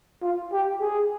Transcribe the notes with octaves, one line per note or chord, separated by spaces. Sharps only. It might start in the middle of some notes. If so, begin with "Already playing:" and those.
F4
G4
G#4